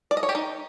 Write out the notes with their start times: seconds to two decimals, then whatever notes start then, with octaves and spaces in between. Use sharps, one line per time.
0.11 D5
0.17 D#5
0.23 C#5
0.29 G4
0.35 D#4